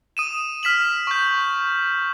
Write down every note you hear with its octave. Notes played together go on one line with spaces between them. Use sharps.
D#6 D#7 E7
F6 B6 E7 F#7
C#6 G6